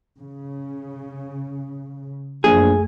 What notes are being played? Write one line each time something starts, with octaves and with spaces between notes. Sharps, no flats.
C#3
A#1 F#2 A3 G#4